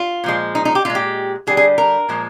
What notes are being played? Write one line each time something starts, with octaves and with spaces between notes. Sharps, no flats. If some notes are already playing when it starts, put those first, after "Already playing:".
Already playing: F4
A#2 F3 G#3
D#4
D#4
G4
A#2 G#3 F4
G4
D3 G3 G#4
G#4
A#4
A#2 F3 G#3